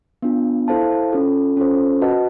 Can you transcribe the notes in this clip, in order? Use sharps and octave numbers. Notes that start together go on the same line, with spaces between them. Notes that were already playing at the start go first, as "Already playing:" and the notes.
B3 D4 F4
E4 A4 C5 F5 A5
C#4 F4 A4
C#4 F4 A4 C5
F#4 B4 D#5 F#5 A5